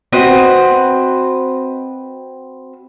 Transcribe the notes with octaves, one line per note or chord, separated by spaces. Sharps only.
C4 F#4 B4 D#5